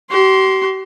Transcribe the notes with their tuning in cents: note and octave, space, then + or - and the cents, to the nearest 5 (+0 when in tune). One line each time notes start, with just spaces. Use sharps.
G4 -45 C6 +0